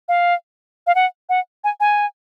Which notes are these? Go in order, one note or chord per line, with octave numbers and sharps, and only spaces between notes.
F5
F5
F#5
F#5
G#5
G#5